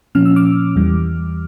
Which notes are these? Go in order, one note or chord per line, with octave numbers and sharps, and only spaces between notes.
A#2 F3 C#4 F6
E6
D6 F6
E2 E3 G3